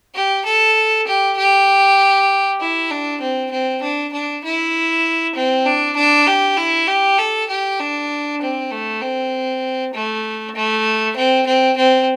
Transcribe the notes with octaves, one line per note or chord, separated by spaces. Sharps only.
G4
A4
G4
G4
E4
D4
C4
C4
D4
D4
E4
C4
D4
D4
G4
E4
G4
A4
G4
D4
C4
A3
C4
A3
A3
C4
C4
C4